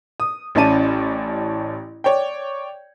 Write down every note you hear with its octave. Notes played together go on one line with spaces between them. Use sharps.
D#6
A1 C#4 E4 D5 A5 D#7
C#5 D5 G5